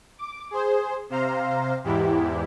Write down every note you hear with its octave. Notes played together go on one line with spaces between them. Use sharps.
D6
G#4 C5
C3 C5 F5 A#5
E2 G#2 E4 G4